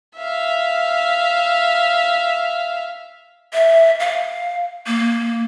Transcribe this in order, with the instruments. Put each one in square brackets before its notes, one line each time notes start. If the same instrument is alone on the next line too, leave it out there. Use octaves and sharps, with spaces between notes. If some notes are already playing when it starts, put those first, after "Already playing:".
[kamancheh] E5 F5
[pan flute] E5
F5
A#3